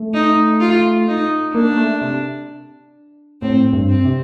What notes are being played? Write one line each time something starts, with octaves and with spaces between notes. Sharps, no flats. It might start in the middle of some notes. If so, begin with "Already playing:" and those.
Already playing: A3
D#4
F4
D#4
A#3 D4
A3
C3
A2 C4
G2
C4
C3